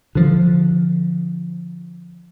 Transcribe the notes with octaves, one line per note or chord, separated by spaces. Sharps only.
D3 F3